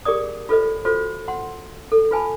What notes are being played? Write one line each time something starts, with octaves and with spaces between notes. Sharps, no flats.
G4 G#4 A#4 D5 D#6
F4 A4 B4 C5 D#5
F4 F#4 A4 C5
F#5 C6
A4
F4 B4 G#5 A5 B5